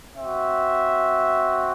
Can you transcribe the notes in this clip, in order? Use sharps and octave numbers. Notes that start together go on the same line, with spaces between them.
C4 F#4 E5